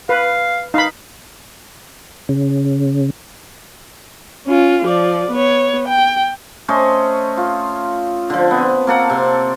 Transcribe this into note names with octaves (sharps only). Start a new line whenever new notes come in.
B4 F5
D#4 F5 B5
C#3
C#4 F4
F3 D5
B3 C#5
G5
A3 C#4 C5 D#5
F4
D3 F3
B3 C4
A#3 A4 F#5 C#6
C3 C6